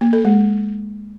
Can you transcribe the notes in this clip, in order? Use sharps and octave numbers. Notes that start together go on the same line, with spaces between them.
A#3
A4
G#3